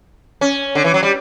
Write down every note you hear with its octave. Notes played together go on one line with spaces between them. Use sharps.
C#4
D3
E3
F#3
G3